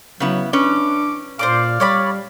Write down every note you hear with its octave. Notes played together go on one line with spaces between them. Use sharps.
C#3 F#3 B3 E4
C#4 D4 B4 D6
A#2 C5 D5 F5 D6
G3 C#5 D5 B5